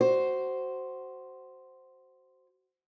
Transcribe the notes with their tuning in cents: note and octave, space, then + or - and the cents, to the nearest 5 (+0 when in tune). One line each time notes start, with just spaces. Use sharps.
F#4 +20 C5 +0